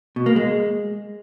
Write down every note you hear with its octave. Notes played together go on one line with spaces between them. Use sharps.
B2
A#3
G#3